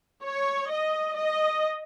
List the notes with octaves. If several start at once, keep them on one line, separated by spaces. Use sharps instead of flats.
C#5
D#5
D#5